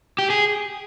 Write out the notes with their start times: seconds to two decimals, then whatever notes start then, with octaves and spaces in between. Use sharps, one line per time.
0.19 G4
0.30 G#4